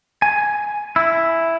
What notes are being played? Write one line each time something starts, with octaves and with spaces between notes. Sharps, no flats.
G#5
E4